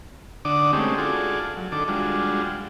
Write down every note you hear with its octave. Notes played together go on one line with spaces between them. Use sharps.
D3 D4 D5 F#5 D6 D#6
G#3 A3 C4 C#4 D#4 G4
F4 F#4 G#4 A4 D5
F#3
D#3 D4 A4 D6
G3 G#3 D4 F4 F#4